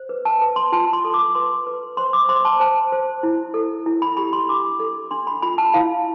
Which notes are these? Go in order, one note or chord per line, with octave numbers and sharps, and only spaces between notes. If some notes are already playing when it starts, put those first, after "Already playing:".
Already playing: C5
B4
A5
B4
C6
F4 A5
C6
A4
D6
B4 C6
B4
C5 C6
D6
C5 C6
A5
C5 A5
C5
E4
A4
E4
B5
G4 B5
C6
D4 D6
A4
D4 C6
B5
F4 B5
A5
E4 F5